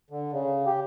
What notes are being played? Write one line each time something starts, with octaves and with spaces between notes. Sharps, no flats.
D3
C#3
G4